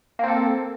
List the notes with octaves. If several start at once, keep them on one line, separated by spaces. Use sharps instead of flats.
A#3 C4 A4